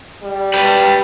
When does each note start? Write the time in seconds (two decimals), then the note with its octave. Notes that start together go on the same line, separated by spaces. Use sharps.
0.23 G3
0.54 B4 G5